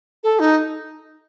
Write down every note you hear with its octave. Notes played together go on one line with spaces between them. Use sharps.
A4
D#4